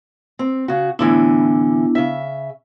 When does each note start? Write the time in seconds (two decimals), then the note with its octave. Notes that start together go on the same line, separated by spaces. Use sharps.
0.39 C4
0.68 C#3 F#4
0.99 A2 D3 E3 B3 D4 E4
1.95 C#3 E5